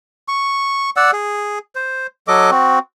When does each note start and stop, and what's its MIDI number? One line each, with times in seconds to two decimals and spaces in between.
0.28 0.90 85
0.97 1.11 74
0.97 1.11 78
0.97 1.11 88
1.13 1.59 68
1.75 2.07 72
2.28 2.50 54
2.28 2.50 69
2.28 2.50 75
2.28 2.50 86
2.51 2.79 60
2.51 2.79 66